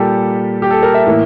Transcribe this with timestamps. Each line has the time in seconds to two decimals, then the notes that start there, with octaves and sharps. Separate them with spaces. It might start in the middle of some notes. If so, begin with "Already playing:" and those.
Already playing: A#2 G3 A#3 G4 A4
0.62 G4
0.71 A4
0.82 A#4
0.94 E5
1.07 A2 E3 A#3